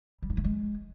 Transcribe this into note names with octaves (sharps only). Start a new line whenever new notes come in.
G3
D#4
A3
G#3